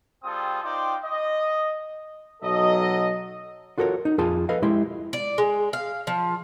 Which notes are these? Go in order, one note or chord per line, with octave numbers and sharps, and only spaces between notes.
G3 C4 F4 G#4 A4 D#6
D#4 F4 C5 D5 G5
D#5
B1 F#3 A4 D#5
F4 F#4 A4 A#4 C5 C#5
D#4
F2 F4 G#4 A5 C6
A4 B4 D#5 F5
G#3 E4 G4 E5 C6
D5
G#3
F5
F3